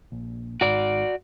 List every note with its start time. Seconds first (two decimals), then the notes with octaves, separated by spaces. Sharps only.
0.12 A#1
0.61 G#1 G#2 F#4 D5